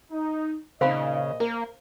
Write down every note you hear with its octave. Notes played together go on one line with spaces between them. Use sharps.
D#4
A#2 C#3 C4 D#4 C5 D#5 F5 B5
A#3 A#4